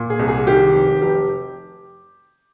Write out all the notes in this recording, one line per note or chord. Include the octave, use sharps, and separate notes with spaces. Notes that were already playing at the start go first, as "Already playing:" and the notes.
Already playing: A#2
G#4
C2
G#4
D#3 G4
F1
F1 G4